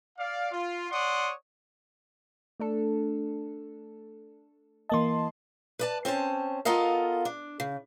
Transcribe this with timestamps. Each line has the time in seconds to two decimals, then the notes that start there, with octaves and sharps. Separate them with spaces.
0.18 D5 F5
0.52 F4
0.91 C#5 D5 F#5 C6 D#6
2.60 A3 D4 A4
4.89 E3 A#3 D#5 A5 C6
5.79 B4 D5 A5
6.05 C4 C#4 C5 A5
6.65 B3 F4 A4 A#4 D#5 F5
7.25 D4
7.60 C#3